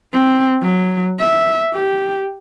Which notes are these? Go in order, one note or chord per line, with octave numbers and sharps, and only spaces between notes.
C4
F#3
E5
G4